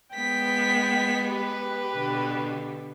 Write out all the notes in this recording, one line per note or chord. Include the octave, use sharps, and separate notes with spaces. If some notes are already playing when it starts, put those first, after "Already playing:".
G#3 B3 G5 B6
G4 B4
B2 D3